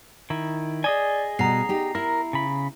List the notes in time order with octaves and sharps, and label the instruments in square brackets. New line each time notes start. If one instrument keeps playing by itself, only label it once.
[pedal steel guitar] D#3 E4
[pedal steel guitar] G#4 D#5 G#5 [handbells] D5
[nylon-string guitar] B2 G3 [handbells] A#5 C7
[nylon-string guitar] D#4 G4
[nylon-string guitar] E4 [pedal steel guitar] A#4
[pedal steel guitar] C#3 B5